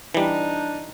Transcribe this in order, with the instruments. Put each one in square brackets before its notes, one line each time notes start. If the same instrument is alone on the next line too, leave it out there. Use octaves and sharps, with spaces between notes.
[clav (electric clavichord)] E3 G3 [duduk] D4 [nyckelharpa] D#4